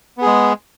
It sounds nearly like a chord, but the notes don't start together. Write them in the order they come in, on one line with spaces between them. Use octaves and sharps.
B3 G#4 G#3